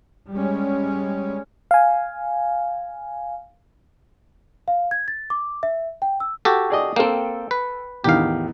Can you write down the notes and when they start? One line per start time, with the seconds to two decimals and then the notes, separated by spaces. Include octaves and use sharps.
0.31 G3 G#3 C#4
1.71 F5 G#5
4.68 F5
4.91 G#6
5.08 A6
5.30 D6
5.63 E5
6.02 G5
6.20 E6
6.45 F#4 G4 A4
6.70 G#4 D5 D#5
6.96 A#3 C4 A4 G5
7.51 B4
8.04 E2 A2 D#3 G4 F5